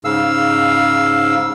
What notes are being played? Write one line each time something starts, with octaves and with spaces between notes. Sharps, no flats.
G#2 C#3 F5 E6